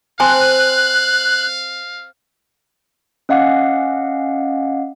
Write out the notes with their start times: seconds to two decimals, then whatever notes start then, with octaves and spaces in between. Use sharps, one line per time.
0.20 C4 F5 G#5 A5 C6 F#6
3.29 C#4 D#5 F5 F#5 D6